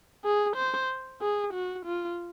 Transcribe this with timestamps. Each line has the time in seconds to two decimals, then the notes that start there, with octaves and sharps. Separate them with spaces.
0.25 G#4
0.57 C5
1.22 G#4
1.54 F#4
1.86 F4